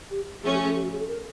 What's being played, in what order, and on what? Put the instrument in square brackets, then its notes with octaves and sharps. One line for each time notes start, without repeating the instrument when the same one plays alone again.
[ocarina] G4
[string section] F3 A3 C#4 [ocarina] G#4
[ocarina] G4
G#4
G4
F#4
G#4
A4
A#4